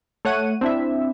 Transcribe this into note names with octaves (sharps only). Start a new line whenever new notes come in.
A3 C#5 F#5 D#7
C4 D4 E4 E5